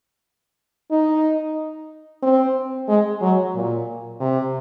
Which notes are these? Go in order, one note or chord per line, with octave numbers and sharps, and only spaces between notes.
D#4
C4
G#3
F#3
A#2
C3